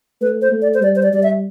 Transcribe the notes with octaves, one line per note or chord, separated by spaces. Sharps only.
A3 B4
C5
A3
D5
C5
G3 D5
C5
D5
G3 D5
E5